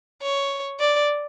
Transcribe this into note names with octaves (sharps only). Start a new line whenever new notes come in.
C#5
D5